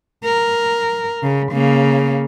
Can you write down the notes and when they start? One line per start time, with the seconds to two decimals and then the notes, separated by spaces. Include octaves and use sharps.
0.25 A#4
1.23 C#3
1.52 C#3 A#3